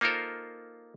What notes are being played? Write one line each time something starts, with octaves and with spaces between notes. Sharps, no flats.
A#3 D#4 F4 A4 A#4 C5